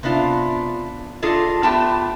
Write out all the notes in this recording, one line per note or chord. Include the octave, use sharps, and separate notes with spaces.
C3 B3 D4 F4
D4 F4 G#4 A4 D#5
A3 B3 F4 G4 G5 A5